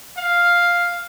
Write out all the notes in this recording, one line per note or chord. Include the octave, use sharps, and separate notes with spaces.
F5